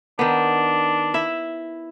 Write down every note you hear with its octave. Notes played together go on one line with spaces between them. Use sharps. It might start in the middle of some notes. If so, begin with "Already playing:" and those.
D#3 B3 D4
E4 E5